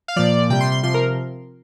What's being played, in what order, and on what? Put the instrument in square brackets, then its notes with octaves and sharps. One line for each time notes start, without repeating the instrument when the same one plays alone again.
[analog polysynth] F5
A#2 F3 D5
C3 G3 G5
C6
C6
C3 F3 C6
A#4